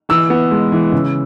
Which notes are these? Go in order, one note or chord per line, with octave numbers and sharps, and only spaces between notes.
E3 E6
B3
G#3
E3
C#3